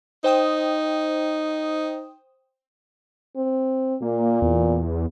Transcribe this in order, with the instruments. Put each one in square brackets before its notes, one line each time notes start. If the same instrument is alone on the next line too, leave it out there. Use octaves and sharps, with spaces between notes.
[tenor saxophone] D#4 [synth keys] C5 G5 D#6
[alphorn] C4
[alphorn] A#2 [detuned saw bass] A#3
[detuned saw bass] E2